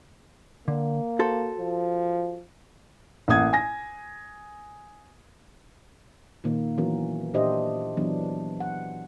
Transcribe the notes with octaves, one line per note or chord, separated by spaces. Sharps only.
D3 A#3
F#4 A4 C5
F3
A1 A#3 F#5 D#6 G#6
G#5 A#6
A#2 D#3 A#3
E3 F#3 B3 C#4 F#4 A#4
A#2 D4 G4 C5 D#5 E5
E3 F#3 B3 D4
F#5